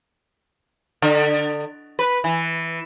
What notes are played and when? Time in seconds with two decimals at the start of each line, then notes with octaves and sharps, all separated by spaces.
1.02 D3
1.99 B4
2.24 E3